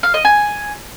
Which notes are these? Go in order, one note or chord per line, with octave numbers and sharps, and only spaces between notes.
F5
D#5
G#5